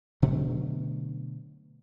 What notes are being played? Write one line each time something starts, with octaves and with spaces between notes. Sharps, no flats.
B2 D3 F#3 A3